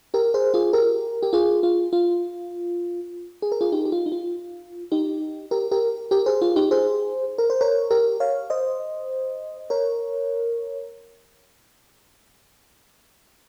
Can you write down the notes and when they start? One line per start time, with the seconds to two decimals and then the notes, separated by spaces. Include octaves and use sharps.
0.14 G4 A#4
0.34 G#4 C5
0.54 F4 G#4
0.73 G4 A#4
1.23 G4
1.33 F4 G#4
1.63 F4
1.93 F4
3.42 G#4
3.52 A#4
3.61 F4 G#4
3.72 D#4 G4
3.85 G4
3.92 F4
4.06 D#4
4.12 F4
4.92 D#4 G4
5.51 G4 A#4
5.71 G4 A#4
6.11 G4 A#4
6.26 G#4 C5
6.42 F4
6.56 D#4 G4
6.71 G#4 C5
7.38 A#4
7.50 C5
7.61 A#4 C#5
7.91 G4 A#4
8.20 C#5 F5
8.50 C5 D#5
9.70 A#4 C#5